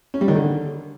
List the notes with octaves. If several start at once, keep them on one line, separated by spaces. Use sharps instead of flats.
C#4
G3
D#3
D3